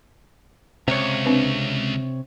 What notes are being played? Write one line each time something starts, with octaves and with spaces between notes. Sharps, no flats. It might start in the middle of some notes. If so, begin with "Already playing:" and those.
C#2 C3 C#5
C4 D4 B4